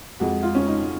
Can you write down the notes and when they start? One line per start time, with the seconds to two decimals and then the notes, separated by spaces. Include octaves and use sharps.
0.20 F2 F3 G#3 F#4
0.43 F4
0.55 C#4
0.67 D#4